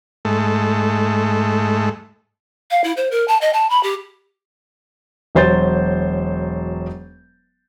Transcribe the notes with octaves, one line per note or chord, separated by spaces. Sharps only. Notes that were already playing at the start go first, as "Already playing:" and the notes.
G#2 A3
F5
E4
C5
A#4
A5
D#5
A5
B5
G4
E1 F#3 C5 G6 A6